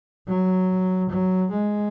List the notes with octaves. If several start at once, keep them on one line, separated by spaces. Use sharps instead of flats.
F#3
F#3
G#3